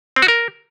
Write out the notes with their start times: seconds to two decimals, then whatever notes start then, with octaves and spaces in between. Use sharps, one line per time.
0.16 C4
0.22 F#4
0.28 A#4